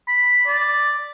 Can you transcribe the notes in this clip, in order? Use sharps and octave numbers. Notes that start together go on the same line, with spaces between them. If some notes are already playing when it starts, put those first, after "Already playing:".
B5
D5